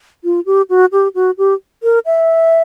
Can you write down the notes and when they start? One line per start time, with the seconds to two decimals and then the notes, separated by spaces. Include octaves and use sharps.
0.24 F4
0.46 G4
0.70 F#4
0.92 G4
1.15 F#4
1.38 G4
1.83 A#4
2.06 E5